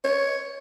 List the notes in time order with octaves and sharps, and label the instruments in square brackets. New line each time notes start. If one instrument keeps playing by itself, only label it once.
[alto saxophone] C#5